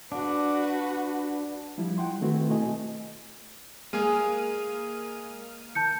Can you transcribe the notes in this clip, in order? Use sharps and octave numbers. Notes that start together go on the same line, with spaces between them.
D4 F#4 B4
F3 G3 E4
F#5 G5 C6
D#3 A3 C4 E4 F#4 B4
B2 A3 C4 D#5 G#5
G#3 A#3 G#4 F6 D#7
A5 G6 C#7